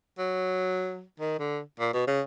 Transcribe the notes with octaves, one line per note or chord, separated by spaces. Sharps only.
F#3
D#3
D3
A#2
B2
C#3